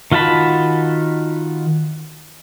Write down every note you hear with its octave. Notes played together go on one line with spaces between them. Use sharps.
D#3 F4 F#4 A5 B5